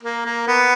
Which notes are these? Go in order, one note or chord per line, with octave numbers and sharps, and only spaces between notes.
A#3
A#3
B3